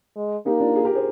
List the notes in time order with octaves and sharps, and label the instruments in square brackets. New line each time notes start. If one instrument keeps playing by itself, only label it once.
[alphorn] G#3
[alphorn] A#3 [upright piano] D#4 G4
[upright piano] D4 F4
F4 G#4
G4 A#4
G#4 C5